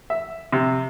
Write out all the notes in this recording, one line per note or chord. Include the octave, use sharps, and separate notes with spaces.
E5
C3